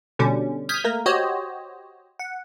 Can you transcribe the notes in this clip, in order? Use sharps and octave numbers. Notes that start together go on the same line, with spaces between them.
B2 D3 G3 C#4
D#6 F6 G6 G#6 B6
A3 A#3 A#4
F#4 G4 C5 C#5 D#5
F#5